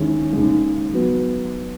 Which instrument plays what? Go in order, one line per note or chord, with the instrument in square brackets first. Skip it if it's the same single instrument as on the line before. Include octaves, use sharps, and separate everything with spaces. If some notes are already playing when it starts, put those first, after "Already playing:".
Already playing: [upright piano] D#2 D#3 G#3 C#4 E4
D#2 C#3 G#3
F#3 B3